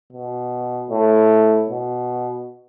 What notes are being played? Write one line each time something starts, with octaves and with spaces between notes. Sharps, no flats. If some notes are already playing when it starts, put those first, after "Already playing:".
B2
A2
B2